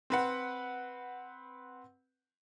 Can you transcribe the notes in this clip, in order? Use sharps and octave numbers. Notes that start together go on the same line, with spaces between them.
C4 B4 F#5